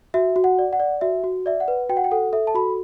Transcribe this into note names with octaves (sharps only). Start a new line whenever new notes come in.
F#4 E5
F#4
F#5
D5
F#5
D5
F#4 E5
F#4
D5 E5
F#5
B4
F#4 G5
F#5
G5
A4 F#5
A4 E5
A5
F#4 B5